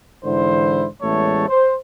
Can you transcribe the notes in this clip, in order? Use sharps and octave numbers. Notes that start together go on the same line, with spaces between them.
G#2 D3 E3 E4 C5
A1 E2 G#3 A3 A4 C#5
C5